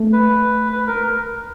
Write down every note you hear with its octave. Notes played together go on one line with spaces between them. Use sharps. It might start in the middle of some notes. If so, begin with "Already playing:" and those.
Already playing: A3
B4
B4
A#4